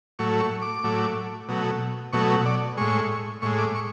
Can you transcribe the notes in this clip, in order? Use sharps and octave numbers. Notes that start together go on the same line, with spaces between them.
A2 F#3 A3 C#6
C#6
D6
A2 F#3 A3
B2 F#3 A3
B2 F#3 A3 C#6
D5
A2 G#3 C#6
A2 G#3 C#6
D6
C#6